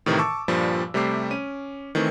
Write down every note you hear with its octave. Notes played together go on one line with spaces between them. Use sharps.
A2 C3 D#3 E3 A#4
A5 C#6 D6 E6
G2 A#2 F3 G3
C3 G3 A3 C5 D6 C7
C#4 D#7
D#3 E3 A3 C4 D#4